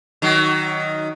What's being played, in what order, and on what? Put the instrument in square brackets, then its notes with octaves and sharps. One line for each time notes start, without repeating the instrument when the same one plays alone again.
[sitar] D#3 F#3